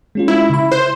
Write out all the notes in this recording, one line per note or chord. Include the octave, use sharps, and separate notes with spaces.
G#3 C#4 F4
E4
C#3 B5
C5 F#6